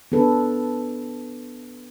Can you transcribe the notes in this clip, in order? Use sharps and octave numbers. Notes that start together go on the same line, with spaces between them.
B3 D4 A4 B4